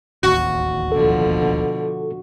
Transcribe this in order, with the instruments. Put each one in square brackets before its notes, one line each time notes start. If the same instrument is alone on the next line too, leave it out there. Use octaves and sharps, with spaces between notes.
[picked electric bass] D1 A1 D#2 [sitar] F#4
[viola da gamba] B2 D3 F3 [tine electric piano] A4